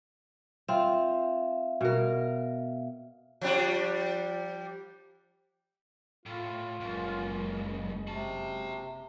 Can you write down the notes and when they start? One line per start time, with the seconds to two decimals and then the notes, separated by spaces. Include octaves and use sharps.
0.68 C4 F4 E5 F5
1.81 B2 A#4
3.41 F3 G3 D4
6.26 A2 F4
6.80 F#1 C#2 F#2 G#3
8.07 C3 F#4 A5